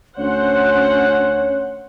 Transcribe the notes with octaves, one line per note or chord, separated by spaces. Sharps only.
D2 C#4 C5 C#5 F#5